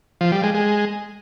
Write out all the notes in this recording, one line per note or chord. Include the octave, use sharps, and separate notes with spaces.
F3
G3
G#3
G#3